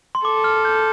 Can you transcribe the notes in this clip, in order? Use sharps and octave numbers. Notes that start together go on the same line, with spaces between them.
C6
A4 D6
F6
G6